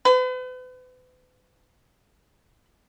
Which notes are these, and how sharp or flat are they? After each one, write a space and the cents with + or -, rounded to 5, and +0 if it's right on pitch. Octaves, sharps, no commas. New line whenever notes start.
B4 +40